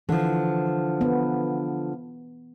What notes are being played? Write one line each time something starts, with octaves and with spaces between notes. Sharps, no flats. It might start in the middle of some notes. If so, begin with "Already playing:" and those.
D3 E3 F3
B3